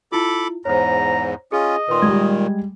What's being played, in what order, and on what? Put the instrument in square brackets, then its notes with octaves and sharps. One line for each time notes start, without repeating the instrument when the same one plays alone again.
[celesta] E4 F4 [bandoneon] A4 B5 D6
[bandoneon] E2 G#2 [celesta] C5 C#5 [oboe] A#5
[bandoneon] C#4 F4 [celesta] G#4 [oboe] D#5
[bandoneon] A#2 D#3 [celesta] B4 C6
[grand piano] G3 G#3 [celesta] G#6